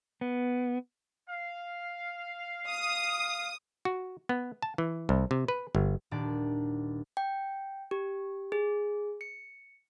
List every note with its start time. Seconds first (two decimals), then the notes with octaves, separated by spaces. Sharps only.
0.21 B3
1.28 F5
2.70 D#6
3.85 F#4
4.29 B3
4.62 A5
4.78 E3
5.09 C2
5.31 C3
5.48 B4
5.75 G1
6.11 D#1 D4 D5
7.17 G5
7.91 G4
8.52 G#4
9.21 C#7